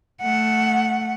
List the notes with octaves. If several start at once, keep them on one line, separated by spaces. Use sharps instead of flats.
A3 F#5